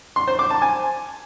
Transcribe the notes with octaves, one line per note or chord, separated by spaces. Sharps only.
C6
C5
D6
A5
G#5